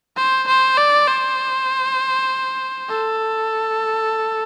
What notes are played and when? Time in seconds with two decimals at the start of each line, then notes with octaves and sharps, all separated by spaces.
0.17 C5
0.48 C5
0.78 D5
1.08 C5
2.90 A4